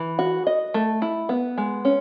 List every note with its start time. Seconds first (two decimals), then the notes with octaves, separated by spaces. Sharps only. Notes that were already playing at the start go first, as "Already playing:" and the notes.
Already playing: E3
0.19 F#4
0.47 D#5
0.74 A3
1.02 E4
1.29 B3
1.58 G#3
1.85 C#4